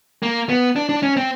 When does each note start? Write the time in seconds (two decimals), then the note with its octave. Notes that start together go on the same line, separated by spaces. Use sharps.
0.23 A#3
0.49 B3
0.76 D4
0.89 D4
1.03 C#4
1.17 C4